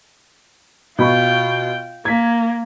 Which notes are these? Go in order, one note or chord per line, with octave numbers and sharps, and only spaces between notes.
B2 F4 G5 B5 C#6
A#3 G#6 B6